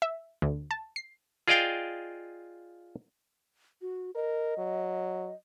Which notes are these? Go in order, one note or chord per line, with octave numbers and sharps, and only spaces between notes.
E5
D2
A5
C7
F4 G#4 D5 D#5 F5 G5
F#4
A#4 D#5
F#3